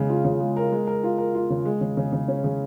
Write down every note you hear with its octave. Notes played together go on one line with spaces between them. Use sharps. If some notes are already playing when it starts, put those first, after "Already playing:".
Already playing: C#3 G#3
F4
C#3
G#3
A#4
G#3
A#4
F4
A#4
F4
C#3
G#3
C#3
C#3
C#3
C#4
C#3